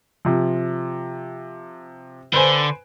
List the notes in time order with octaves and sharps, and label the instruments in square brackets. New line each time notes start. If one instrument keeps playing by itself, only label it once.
[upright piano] C3 F3
[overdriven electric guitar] D3 [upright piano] B4 C5 G#5